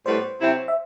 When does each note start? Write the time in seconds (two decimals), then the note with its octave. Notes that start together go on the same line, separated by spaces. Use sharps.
0.05 A2 G3 B3 F#4 B4 C5
0.39 C3 F#3 C4 E4
0.68 E5